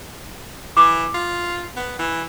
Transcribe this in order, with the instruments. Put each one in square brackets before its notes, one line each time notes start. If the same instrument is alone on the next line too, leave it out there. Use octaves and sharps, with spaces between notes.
[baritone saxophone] E3 [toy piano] D6
[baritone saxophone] F4
B3
E3